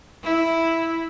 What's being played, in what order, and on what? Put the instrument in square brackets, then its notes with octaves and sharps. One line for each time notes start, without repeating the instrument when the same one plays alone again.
[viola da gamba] E4